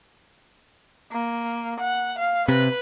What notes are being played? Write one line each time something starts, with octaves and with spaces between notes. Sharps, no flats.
A#3
F#5
F5
C3 B4